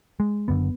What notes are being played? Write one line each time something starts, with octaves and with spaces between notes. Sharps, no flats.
G#3
F#1 F#2 D3 B3